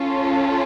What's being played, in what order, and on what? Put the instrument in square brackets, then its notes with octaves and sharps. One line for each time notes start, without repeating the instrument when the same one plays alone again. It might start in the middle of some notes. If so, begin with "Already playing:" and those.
Already playing: [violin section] C#4 F4 A4